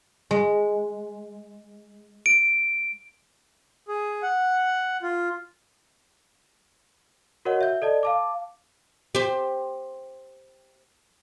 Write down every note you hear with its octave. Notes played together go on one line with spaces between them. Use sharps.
G#3
D7
G#4
F#5
F4
F#4 A#4 C#5 D#5 F#5
E5 G6
A4 D5 D#5 A5
F5 A5 D6
G4 C5